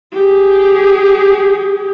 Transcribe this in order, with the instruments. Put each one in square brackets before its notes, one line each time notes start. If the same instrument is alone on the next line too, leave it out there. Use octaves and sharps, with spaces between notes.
[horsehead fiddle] G4 G#4